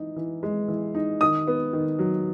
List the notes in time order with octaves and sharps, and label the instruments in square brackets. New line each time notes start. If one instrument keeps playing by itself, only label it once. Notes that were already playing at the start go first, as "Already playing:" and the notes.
Already playing: [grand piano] E3 D#4
E3
G#3
E3
D#4
D#3 D#6
B3
D#3
F#3